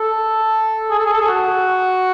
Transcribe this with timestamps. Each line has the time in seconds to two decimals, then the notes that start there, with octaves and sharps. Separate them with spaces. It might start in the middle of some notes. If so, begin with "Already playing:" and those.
Already playing: A4
0.90 G#4
0.99 A4
1.06 G#4
1.13 A4
1.21 G#4
1.28 F#4